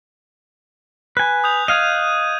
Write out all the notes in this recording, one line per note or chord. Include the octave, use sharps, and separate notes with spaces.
B4 G#5 F#6
D#6 G6 F7
D#5 F5 G#6 D#7